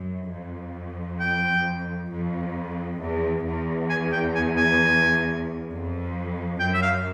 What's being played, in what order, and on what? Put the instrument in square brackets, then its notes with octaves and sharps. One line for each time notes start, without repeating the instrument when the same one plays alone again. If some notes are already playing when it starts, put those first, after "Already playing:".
Already playing: [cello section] F#2
F2
[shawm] G5
[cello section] F2
E2
E2
[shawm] G#5
G5
G#5
G#5
[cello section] F2
[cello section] F#2 [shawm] G5
[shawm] E5
F5